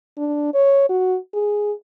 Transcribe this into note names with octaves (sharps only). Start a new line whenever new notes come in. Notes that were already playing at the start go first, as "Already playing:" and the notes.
D4
C#5
F#4
G#4